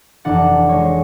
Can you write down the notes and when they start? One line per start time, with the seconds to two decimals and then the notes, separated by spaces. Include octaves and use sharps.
0.25 F1 E3 D4 F#5 C#7
0.69 G#3 C#5